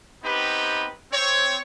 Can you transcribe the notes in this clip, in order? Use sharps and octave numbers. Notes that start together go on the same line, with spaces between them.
B3 C4 D#4 G4 B4
C4 C#5